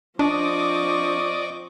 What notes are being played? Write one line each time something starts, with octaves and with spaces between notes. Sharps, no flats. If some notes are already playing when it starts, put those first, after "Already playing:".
F3 C4 D4 D5 D#5 C#6 D6